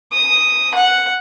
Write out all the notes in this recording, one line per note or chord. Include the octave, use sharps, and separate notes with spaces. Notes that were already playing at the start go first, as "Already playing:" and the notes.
D#6
F#5